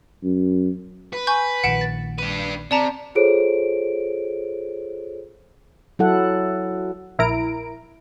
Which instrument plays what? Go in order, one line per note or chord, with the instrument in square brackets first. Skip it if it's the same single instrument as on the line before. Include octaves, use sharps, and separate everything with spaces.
[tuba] F#2
[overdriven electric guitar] B4
[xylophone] G#5 C#6 G6
[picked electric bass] A#1 A#2 D#3 [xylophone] F#5 D7 E7
[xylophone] A6
[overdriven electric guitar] D4 B4 [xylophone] D#7
[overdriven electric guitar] C3 [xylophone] D5 A5 A#5
[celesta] F4 G#4 A4 C5 C#5 D7
[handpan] F#3 E4 A4 F#5
[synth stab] A#1 E4 A#4 A#5 D7